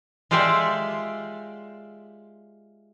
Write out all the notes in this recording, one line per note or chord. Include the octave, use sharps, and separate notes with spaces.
G#3 F4 G4 A4 D5 E5